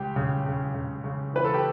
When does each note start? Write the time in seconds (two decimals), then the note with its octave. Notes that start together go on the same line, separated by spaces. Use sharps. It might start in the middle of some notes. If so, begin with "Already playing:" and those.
Already playing: C#2 G4
0.16 C#3
0.46 C#3
0.74 C#3
1.04 C#3
1.33 E3 B4
1.45 A4
1.54 G4